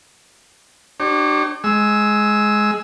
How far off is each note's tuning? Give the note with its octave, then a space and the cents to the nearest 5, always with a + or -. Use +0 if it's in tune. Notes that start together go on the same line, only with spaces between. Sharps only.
D4 +35 G4 -35 C#5 -35
G#3 +15 E6 -10